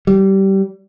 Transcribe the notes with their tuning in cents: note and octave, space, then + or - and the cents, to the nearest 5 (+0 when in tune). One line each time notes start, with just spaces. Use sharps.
G3 -20